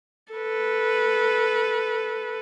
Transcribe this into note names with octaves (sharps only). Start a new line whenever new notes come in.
A4 B4